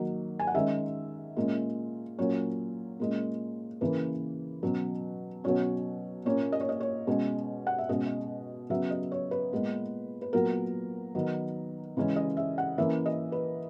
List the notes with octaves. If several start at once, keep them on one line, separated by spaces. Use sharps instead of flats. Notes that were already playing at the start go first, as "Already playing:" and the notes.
Already playing: D#3 F#3 A#3
G#5
F#5
D#3 G#3 C#4 E5
A#2 G#3 C#4
A#2 F#3 C#4 C#5
A#2 G#3 C#4
C#3 E3 A#3 B4
B2 F#3 C#4
B2 F#3 C#4 C#5
A#2 A#3 C#4 C#5
D#5
C#5
D#5
C#5
B2 G#3 C#4
F#5
E5
B2 G#3 C#4 D#5
C#3 F#3 B3 E5
D#5
C#5
B4
A#2 G#3 B3
B4
A#2 F#3 B3 A#4
D#3 F#3 B3
C#3 E3 G#3 C#4
D#5
E5
F#5
E3 A#3 C#4 E5
D#5
B4